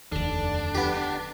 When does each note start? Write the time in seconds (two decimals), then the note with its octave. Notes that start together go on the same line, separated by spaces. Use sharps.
0.12 F1 D#2 D3 D4 A4
0.75 B3 G4